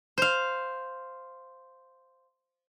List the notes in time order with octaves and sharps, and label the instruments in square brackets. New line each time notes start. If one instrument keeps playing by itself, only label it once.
[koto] C5 F5